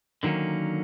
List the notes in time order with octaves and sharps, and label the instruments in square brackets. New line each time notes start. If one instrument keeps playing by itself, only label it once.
[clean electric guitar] D3 D#3 F#3 A#3 C#4